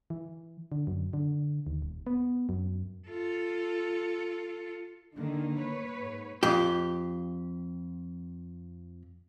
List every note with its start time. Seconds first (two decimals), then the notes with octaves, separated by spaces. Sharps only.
0.10 E3
0.72 D3
0.87 F#2
1.13 D3
1.67 D#2
1.82 D#1
2.07 B3
2.49 F#2
3.08 F4 A4
5.17 D3 D#3 A#3
5.58 B4 C#5
5.99 G#2
6.43 F2 G4